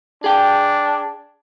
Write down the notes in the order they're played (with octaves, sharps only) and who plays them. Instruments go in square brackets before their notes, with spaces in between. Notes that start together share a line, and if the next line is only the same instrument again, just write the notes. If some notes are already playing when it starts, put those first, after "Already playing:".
[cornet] D4 [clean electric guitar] G#4 G5